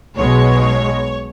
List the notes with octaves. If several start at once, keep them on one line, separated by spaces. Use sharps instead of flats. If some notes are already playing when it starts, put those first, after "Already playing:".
B1 B2 G#3 C#5